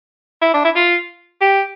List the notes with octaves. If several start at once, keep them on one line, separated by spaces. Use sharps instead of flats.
E4
D4
E4
F4
G4